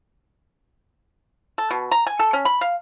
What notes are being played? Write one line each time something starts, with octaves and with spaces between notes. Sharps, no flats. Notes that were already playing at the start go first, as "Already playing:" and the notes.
A4
B2
A#5
G#5
A4
C#4
B5
F5